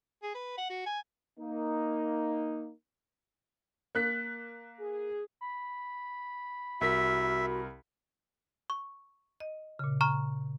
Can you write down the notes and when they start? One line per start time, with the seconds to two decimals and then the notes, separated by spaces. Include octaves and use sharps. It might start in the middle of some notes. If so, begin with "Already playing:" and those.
0.23 G#4
0.34 B4
0.58 F#5
0.70 F#4
0.86 G#5
1.39 A#3 D#4
3.95 A#3 F#6 B6
4.79 G#4
5.41 B5
6.81 C2 F#4 A#4 E5 B6
8.70 C#6
9.40 D#5
9.79 A#2 C#3
10.01 A#5 C#6 F6